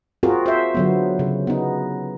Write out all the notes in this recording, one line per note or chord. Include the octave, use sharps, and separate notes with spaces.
C4 F4 F#4 G#4 A#4
C5 E5
D3 F#3 B3
C#3
B3 D#4